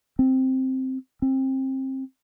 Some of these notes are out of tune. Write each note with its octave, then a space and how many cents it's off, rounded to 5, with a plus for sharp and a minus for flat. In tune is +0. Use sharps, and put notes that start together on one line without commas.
C4 +0
C4 +25